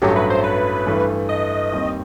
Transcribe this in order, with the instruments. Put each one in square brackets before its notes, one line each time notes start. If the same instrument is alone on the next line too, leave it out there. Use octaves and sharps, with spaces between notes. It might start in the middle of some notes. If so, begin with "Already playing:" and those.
[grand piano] A1 G2 F#3 A3 [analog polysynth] G4
[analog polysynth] B4
C5
B4
[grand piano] G2 E3 A3
[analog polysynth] D#5
[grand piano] D#2 D#3 G3 C4